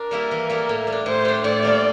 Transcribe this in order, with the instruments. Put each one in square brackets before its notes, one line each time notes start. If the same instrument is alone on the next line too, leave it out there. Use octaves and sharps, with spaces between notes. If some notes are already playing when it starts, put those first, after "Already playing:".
Already playing: [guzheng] D4 [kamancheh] A#4
[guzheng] G3 A#3 E4 A4
E3
G3 A#3 E4 A4
A2
G3
D4
[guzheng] A2 [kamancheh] C5
[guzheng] G3 D4
[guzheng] A2 [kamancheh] D5
[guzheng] G3 A#3 F4 A4